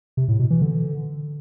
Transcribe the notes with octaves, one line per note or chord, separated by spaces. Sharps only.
C3
A2
B2
E3
D3